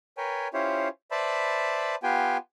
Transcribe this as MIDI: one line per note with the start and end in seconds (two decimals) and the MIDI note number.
0.17 0.48 70
0.17 0.48 71
0.17 0.48 73
0.17 0.48 79
0.17 0.48 80
0.54 0.88 61
0.54 0.88 64
0.54 0.88 65
0.54 0.88 67
0.54 0.88 72
0.54 0.88 73
1.11 1.95 71
1.11 1.95 72
1.11 1.95 74
1.11 1.95 76
1.11 1.95 81
1.11 1.95 83
2.03 2.37 59
2.03 2.37 65
2.03 2.37 67
2.03 2.37 79
2.03 2.37 80